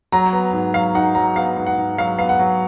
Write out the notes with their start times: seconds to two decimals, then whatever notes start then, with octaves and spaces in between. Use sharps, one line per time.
0.12 F#3 A#5
0.33 B3
0.53 G#2
0.74 F#3 F5
0.95 D#4 F#5
1.15 F#3 A#5
1.36 B3 F5
1.57 G#2
1.66 F#5
1.78 G#2
1.98 F#3 F5
2.18 B3 F5
2.29 F#5
2.39 F#3